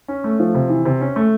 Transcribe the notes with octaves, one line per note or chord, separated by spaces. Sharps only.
C#4
A3
F3
C3
E3
C3
C#4
A3